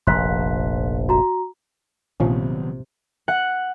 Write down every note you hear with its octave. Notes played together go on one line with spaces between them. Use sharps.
F1 A#1 C6 F#6 B6
F#4 A#5
A#1 C3 D#3 F3 F#3 B3 C#4
F#5